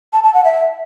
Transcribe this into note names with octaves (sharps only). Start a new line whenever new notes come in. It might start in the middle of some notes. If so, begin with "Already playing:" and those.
A5
A5
F#5
E5